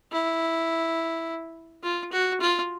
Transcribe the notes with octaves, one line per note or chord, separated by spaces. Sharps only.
E4
F4
F#4
F4